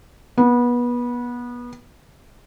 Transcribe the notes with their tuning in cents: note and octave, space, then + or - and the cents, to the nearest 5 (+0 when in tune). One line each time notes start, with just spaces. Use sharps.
B3 -25